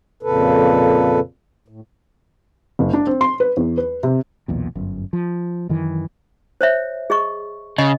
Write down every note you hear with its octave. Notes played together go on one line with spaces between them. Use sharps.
F2 A#2 C#3 A4 B4
A2
F#1
D4
C4
C6
B4
E2
B4
C3
B1 E2 A#2
G1 F#2
F3
F#2 D#3 E3
C5 C#5 E5
G#4 D#5 C#6
C#3 D#5